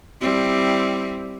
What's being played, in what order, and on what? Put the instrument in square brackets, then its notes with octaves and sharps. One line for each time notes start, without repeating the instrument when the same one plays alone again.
[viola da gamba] G3 C4 E4